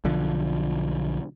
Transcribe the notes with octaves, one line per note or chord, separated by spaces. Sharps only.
B1 D3 F3